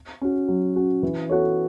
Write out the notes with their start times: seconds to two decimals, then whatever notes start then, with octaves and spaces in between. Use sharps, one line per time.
0.22 C#4 F#4
0.48 F#3
0.76 C#4 F#4
1.03 E3
1.29 B3 F#4 A4 C#5